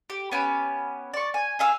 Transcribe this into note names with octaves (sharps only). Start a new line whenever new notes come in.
G4
B3 C#4 G4 B5
D5 C#6
G#5
G#4 E5 F5 E6